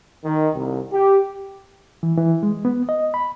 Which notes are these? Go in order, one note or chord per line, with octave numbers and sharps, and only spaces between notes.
D#3
C2
G4
E3
E3
G#3
B3
D#5
B5